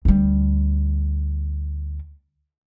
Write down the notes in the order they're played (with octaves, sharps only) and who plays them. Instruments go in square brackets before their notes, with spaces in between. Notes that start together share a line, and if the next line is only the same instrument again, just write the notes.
[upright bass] D2 G3